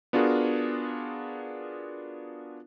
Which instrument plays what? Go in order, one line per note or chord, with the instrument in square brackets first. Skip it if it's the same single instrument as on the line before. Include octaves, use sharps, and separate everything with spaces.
[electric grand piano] B3 D4 F4 F#4 G#4 A#4